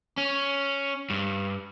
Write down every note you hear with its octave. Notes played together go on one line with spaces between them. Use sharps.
C#4
G2